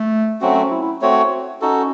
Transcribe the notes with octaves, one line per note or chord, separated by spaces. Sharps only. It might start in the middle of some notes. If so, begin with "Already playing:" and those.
Already playing: A3
F#3 A3 C4 C#4 F#4
E4
E4
A3 C4 F#4 C#5
C#4 D#4 F#4 A4